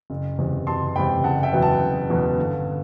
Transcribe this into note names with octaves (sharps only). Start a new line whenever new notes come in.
F#1
E2 C3
F#1 A5 C6
E2 C3 G5 B5
F#1 F#5 A5
E5 G5
E2 B2 F#3 B3
F#5 A5
F#1
E2 B2 F#3 B3
G1